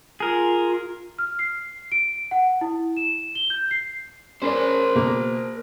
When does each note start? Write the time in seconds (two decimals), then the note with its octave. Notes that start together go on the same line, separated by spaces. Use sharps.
0.20 F4 G#4 A#4
1.19 F6
1.39 C7
1.92 D7
2.31 F#5
2.61 E4
2.97 E7
3.35 G7
3.50 G6
3.71 C7
4.42 C#4 A#4 C5 D5
4.95 B2 A#3